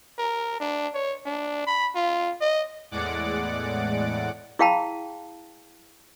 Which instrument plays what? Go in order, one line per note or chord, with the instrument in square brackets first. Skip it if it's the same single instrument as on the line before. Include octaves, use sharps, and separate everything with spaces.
[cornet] A#4
D4
C#5
D4
B5
F4
D#5
[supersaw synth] E2 A2 G#3 D5 F#5 D6
[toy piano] E4 G#4 F5 G5 A5 B5